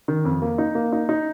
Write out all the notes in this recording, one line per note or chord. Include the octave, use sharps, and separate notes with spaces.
D#3
F2
A#3
D#4
A#3
D#4
D#4